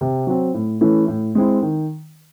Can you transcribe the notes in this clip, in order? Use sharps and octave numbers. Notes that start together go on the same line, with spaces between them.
C3
F#3 C4
A2
E3 A3 C#4 E4
A2
G#3 C4 E4
D#3